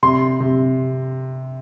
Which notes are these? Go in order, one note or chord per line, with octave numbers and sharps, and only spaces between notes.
C3 C6
C3